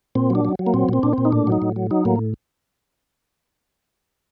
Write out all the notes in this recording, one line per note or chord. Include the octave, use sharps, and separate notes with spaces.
A#2 C4
F#3 D4
F#3
F#3
A#3
A#2 C4
A#2 C4
A#2 D4
A#2 C4
D#4
A2 D4
F#3 D#4
A2
F#3
F#3 D#4
A2 A#3